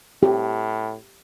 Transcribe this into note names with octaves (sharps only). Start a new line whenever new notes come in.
A2 G4